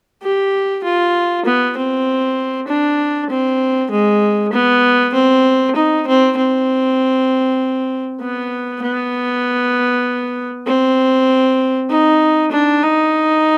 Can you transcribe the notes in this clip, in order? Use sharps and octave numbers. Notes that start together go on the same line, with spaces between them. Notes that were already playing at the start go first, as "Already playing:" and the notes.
G4
F4
B3
C4
D4
C4
G#3
B3
C4
D#4
C4
C4
B3
B3
C4
D#4
D4
D#4